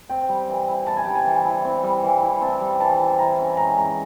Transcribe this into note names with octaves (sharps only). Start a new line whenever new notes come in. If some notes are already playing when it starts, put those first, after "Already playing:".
C4 G5
G3
E3
E4
C4 A5
G#5
G3 G5
G#5
E3
E4
C4
G3
E3
E4
C4 A5
G3
E3 A5
E4
E4 A#5
C#4
G#3 A#5
G#3 A#5